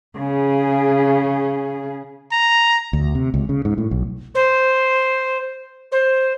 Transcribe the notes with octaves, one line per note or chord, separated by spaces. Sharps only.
C#3 G#4
A#5
D2
C3
C#2
C#3
G#2
A2
B1
C5
C5